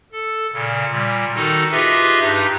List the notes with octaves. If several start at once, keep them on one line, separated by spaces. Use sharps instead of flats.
A4
A#2 C#3
A#2 G3
D#3 D#4 F#4 A4
F4 G4 G#4 B4 D#5 E5
G2 D#4 G4